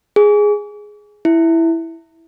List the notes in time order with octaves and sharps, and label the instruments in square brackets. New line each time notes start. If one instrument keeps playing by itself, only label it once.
[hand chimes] G#4
E4